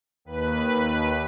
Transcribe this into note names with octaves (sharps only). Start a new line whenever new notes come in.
D#2 B4